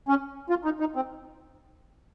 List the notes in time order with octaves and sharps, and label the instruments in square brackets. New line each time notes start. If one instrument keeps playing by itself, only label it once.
[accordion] C#4
F4
D#4
D#4
C4